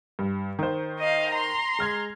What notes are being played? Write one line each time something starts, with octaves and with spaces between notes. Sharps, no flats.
G2
D#3 C5
D#5 F5
A#5 C6
G#3 F6 G#6